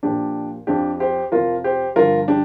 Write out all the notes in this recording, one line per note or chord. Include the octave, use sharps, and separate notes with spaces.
A#2 F3 D4 G4
F2 F3 D4 G4
G4 C5
F2 C3 F3 F4 A#4
G4 C5
G2 D3 F3 F4 A#4
D4 G4